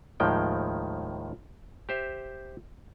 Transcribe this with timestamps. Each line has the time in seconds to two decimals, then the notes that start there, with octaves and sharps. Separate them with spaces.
0.20 D#2 A2 D#3 F3 G#3 G5
1.89 G4 C5 E5